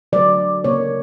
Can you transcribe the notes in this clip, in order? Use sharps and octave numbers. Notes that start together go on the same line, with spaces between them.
D3 F#3 A3 D5
C#3 F#3 A#3 C#5